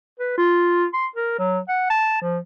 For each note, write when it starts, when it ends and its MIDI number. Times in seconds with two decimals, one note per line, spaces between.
0.20 0.33 71
0.38 0.86 65
0.94 1.07 84
1.16 1.36 70
1.39 1.59 54
1.69 1.88 78
1.90 2.18 81
2.22 2.39 53